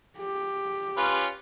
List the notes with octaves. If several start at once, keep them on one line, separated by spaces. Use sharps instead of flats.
G4
C#4 F4 B4